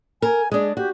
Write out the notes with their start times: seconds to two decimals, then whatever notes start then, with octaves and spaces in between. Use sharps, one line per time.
0.22 A#4 G#5
0.52 G#3 D4 G#4
0.77 F#4 G4